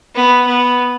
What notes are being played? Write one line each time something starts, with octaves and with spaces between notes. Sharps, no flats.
B3
B3